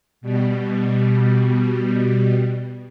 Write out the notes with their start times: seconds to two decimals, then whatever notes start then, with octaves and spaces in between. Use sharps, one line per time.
0.21 B2 G3